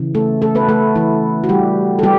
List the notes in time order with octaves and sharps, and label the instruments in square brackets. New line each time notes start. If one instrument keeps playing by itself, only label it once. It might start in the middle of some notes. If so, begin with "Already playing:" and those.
Already playing: [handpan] C#3 E3
A3 A4
A3 A4
B3 B4
A3 A4
E3 E4
F#4
G3 G4
A4
G3 B3 G4